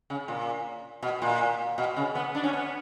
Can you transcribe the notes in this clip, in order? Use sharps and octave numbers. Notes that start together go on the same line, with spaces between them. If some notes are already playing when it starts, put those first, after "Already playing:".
C#3
A#2
B2
A#2
B2
C#3
B3
D4
C#4
B3